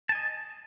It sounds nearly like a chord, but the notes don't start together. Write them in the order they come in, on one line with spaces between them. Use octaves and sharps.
A5 G#5 D#5